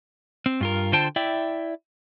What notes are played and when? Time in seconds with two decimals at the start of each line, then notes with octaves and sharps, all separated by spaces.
0.46 C4
0.61 G2 F4 A#4
0.92 D3 F4 C5 G5 A5
1.16 E4 D5 E5 G5